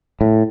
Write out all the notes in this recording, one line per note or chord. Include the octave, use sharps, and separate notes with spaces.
A2